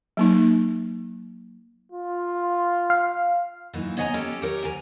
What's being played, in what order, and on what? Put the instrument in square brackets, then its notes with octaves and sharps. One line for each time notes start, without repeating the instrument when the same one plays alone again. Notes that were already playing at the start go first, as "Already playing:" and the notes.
[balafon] F#3 A#3 D#4
[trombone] F4
[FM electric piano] F5
[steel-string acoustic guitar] F#2 A#2 E3 D#4
B3 C#5 D#5 F5 G#5 A#5
C#4 G4 A4
G4 A#4 C#5
D2 G#5 A#5